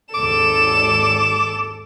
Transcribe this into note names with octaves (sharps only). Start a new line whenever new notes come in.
G#1 D#2 G#3 A4 D6 E7